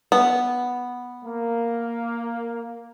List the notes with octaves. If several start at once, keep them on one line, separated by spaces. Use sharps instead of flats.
B3
A#3